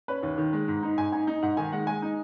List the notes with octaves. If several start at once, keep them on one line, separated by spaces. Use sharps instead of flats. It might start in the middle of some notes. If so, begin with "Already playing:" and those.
C#4 B4
D#2
D#3
G#3
G#2
D#4
G#2 G#5
D#4 G#5
D#4
G#2 F#5
D#3 G#5
G#3 F#5
G#3 G#5
D#4